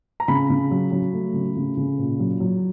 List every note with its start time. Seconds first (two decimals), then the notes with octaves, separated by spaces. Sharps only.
0.20 A#5
0.28 C#3 B5
0.49 C#3
0.71 F#3
0.92 F#3
1.13 A3
1.34 C#3
1.56 C#3
1.77 C#3
1.98 A#2
2.20 F#3
2.40 F#3